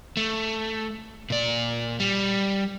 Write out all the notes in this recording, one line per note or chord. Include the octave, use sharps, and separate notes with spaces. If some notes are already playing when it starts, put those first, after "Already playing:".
A3
A#2 D5
G3